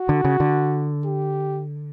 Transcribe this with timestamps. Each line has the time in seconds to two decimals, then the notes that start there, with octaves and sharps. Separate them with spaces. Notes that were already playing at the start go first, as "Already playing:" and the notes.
Already playing: F#4
0.09 D3
0.24 C#3
0.40 D3
1.05 G4